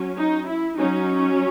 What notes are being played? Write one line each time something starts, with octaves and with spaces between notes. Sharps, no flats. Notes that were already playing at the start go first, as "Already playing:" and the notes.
Already playing: F#3 C#4
D#4
E4
F#3 C#4 D#4